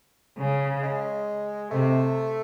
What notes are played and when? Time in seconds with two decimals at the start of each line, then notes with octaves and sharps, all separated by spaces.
0.38 C#3
0.83 G#3
1.71 C3 A3